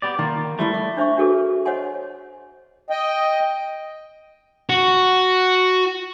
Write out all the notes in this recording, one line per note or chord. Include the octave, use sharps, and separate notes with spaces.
B3 G4 D5
D#3 A#3 F4
F3 G3 A3 E4
D5
D4 C5 E5 C#6
D4 F#4 G#4 A4 B4
C5 C#5 D#5 F#5 G#5 C6
D#5 G5
F#4